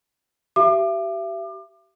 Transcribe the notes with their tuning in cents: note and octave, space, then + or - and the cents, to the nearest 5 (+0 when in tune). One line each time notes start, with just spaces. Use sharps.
G4 -30 E5 +35 D6 +30